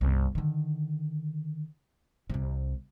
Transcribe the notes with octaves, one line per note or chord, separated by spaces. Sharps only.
G1 C2
D3 D#3
C2 C3